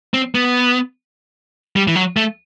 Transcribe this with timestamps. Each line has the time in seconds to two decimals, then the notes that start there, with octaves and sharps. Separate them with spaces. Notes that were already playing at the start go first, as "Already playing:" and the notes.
0.14 C4
0.35 B3
1.76 G3
1.87 E3
1.96 F#3
2.17 A3